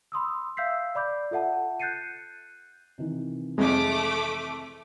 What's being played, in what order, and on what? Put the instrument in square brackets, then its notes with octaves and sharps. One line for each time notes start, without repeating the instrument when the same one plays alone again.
[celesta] B5 C6 D#6 E6
E5 F5 E6 G6 B6 C7
D5 B5 D6 G6
F4 A4 E5 F#5 A5
F#6 G6 A6 C7 C#7 D#7
[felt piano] C3 D#3 E3
[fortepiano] F2 G#3 [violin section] A3 D6